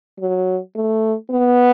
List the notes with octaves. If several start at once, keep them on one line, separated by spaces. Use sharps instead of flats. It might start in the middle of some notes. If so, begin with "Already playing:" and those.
F#3
A3
B3